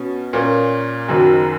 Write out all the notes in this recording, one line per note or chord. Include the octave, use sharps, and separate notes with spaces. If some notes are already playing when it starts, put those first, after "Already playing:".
Already playing: B2 C#4
A#2 A#3 C#4
F#1 F#2 D#3 F#3